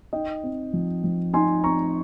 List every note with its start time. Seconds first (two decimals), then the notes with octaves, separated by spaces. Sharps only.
0.13 D#4 D#5 G5
0.43 C4
0.73 F3
1.04 F3
1.33 D#4 G#5 C6
1.64 C4 A#5 C#6